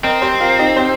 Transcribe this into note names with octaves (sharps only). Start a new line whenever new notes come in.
C4 A#4 D#5
G4 C5
F4 A#4
D#4 G4
G4 C5